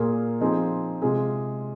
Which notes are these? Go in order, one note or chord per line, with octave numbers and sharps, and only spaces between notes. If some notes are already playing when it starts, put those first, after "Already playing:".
Already playing: A#2 A#3 F4 G#4
F3 C4 D#4 G#4
C3 G#3 F4 G#4